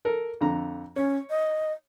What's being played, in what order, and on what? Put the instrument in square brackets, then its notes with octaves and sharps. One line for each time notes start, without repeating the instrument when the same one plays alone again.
[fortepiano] A4 A#4
F2 D3 A#5
[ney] C#4 [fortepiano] C#5
[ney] D#5